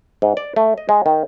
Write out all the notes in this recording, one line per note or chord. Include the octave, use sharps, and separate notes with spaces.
G#2
D5
A3
D#5
G#3
D#3